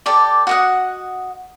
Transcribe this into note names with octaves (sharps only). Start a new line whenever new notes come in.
G4 A4 D5 D6
F#4 D#5 F#5